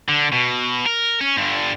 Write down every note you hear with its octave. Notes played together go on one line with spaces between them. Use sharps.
D3
B2
A#4
C#4
G2 D3